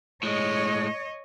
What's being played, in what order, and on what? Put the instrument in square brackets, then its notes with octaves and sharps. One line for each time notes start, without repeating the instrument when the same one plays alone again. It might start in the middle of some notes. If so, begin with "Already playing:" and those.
[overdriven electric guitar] A2 G#3 [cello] C#5 D#5